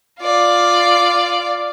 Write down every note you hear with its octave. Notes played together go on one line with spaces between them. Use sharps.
F4 D5